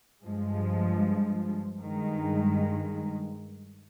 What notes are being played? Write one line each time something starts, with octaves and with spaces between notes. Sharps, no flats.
G2 F3 G#3
G2 D#3 G#3